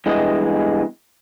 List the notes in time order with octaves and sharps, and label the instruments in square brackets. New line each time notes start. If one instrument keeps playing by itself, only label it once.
[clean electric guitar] E2 G2 E3 G#3 G#4 D#5